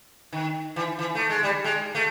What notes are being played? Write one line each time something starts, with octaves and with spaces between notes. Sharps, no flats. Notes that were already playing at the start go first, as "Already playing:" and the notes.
D#3
E3
E3
A3
G#3
G3
G#3
A3